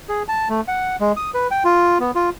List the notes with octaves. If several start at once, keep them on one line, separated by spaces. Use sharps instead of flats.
G#4
A5
A3
F#5
G#3
D#6
B4
G5
F4
B3
F4